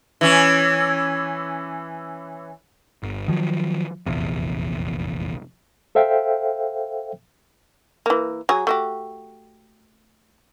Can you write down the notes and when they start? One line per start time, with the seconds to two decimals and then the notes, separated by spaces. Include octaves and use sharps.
0.21 E3 C#4
3.03 G1
3.28 D#3 F3 F#3
4.06 F1 A#1 E2
5.95 A4 C5 E5 F5 G5
8.06 E3 A#3
8.49 F#3 G#4
8.67 A3 F#4 G4